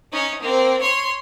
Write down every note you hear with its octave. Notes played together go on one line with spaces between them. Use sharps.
C#4 D#4
A#3 C4
C#5 C6